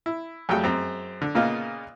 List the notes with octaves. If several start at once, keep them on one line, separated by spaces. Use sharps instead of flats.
E4
F2 F#3 G3 A3 G#4 G5
F#2 G#3 C4 A#5
D3
A#2 C#3 A#3 B3 D#4 F4